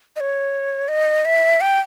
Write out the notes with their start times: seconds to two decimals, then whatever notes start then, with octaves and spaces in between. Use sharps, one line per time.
0.16 D#5
0.20 C#5
0.88 D#5
1.25 E5
1.61 G5